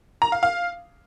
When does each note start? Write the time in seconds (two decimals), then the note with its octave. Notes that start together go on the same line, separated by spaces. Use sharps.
0.22 A#5
0.32 F5
0.43 F5